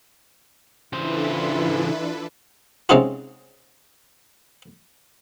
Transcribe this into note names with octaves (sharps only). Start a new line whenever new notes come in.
C#3 E3 D4 E4 F4 A4 B4 C5
C3 G#3 C#4 D#4 F4 F#4